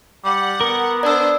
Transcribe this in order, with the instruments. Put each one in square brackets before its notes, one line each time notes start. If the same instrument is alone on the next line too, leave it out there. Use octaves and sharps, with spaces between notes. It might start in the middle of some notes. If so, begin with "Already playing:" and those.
[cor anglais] G3 [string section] F#5
[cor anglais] B3 [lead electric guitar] A#4
[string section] D4 C5 [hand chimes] D5 E6